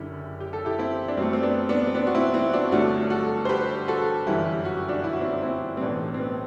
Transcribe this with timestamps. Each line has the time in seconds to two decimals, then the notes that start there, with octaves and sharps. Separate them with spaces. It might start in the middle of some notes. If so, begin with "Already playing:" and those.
Already playing: F#1 F#2 D3 E4 G4
0.40 G4
0.53 A4
0.65 E4 G4
0.79 C4 E4
1.08 D4
1.17 F#2 F#3 A3 C4
1.33 C4
1.43 B3 D4
1.69 B3 D4
1.87 C4
1.94 B3 D4
2.07 F#4
2.15 C4 E4
2.33 C4 E4
2.53 D4 F#4
2.72 G1 G2 F#3 A3 D4 F#4
3.10 F#4 A4
3.45 C5
3.49 G4 B4
3.88 F#4 A4
4.26 G1 F#2 E3 G3 E4 G4
4.65 F#4
4.77 G4
4.88 D4 F#4
5.04 E4
5.13 F#4
5.21 C4 E4
5.32 D4
5.42 C4 E4
5.77 C4
5.80 B1 A2 E3 B3 D4
6.14 C4
6.19 B3 D4